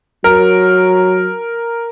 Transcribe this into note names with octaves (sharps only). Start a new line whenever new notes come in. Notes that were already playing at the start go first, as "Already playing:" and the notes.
F#3 A#4